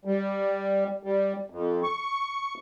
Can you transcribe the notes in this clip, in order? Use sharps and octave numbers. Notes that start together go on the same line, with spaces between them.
G3
G3
F2
C#6